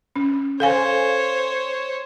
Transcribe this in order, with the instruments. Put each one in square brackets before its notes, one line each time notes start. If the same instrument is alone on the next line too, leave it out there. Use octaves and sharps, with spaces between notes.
[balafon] C#4
[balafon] A4 F5 G#5 [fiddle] C5 C#5